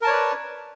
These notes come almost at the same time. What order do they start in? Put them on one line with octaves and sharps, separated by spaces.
A#4 A5 C#5 D5 B4